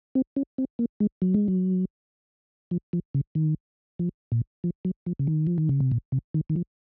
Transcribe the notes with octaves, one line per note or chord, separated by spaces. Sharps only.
C4
C#4
C4
A#3
G#3
F#3
G#3
F#3
F3
F3
C#3
D#3
F3
A#2
F3
F#3
F3
C#3
D#3
F3
D#3
C#3
C3
A#2
C3
D#3
D#3
F3